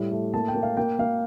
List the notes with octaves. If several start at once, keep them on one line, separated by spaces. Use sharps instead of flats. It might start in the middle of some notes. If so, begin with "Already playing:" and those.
Already playing: A2 G3
A3
A#3 A5
G5
A#3
F5
A#3 G5
A#3 F5